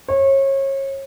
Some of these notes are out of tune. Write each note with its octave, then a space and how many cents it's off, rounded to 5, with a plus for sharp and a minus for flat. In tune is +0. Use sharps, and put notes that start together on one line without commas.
C#5 -30